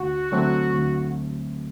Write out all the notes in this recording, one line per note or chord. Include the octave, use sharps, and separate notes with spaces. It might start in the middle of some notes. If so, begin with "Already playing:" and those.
Already playing: D2 F#4
D3 F#3 A3 C4
D2